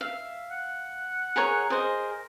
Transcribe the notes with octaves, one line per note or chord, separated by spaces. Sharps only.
E5 F5
F#5
G#4 A#4 C#5
G#4 A#4 C5 D#5